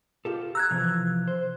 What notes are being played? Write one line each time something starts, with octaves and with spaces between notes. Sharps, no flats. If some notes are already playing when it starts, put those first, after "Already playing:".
F4 G4 A4
A#5 E6 F#6 G#6
C3 E3 F3
C5